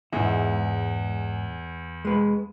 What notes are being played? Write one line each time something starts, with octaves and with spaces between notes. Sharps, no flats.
E2 G#2 G#3 E4
G#3 B4